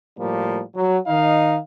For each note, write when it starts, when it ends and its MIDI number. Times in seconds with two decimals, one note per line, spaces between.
0.18 0.61 45
0.18 0.61 53
0.18 0.61 55
0.18 0.61 58
0.75 0.98 54
1.07 1.57 51
1.07 1.57 63
1.07 1.57 75
1.07 1.57 77